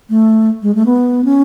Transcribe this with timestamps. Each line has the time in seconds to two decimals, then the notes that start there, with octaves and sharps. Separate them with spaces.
0.09 A3
0.62 G#3
0.75 A3
0.86 B3
1.25 C#4